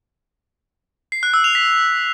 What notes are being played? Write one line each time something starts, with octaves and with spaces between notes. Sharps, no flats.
C7
F#6
E6
F7
B6